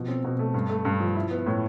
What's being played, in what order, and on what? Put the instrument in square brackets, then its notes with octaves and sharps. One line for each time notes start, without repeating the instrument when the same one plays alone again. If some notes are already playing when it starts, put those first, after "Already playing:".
Already playing: [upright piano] B2 F3
C4
B2
A3
G2
A3
G2
F3
E4
B3
A2